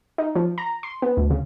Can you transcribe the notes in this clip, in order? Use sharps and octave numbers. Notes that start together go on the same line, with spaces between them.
D#4
F3
A#5
C6
B3
D2
C#3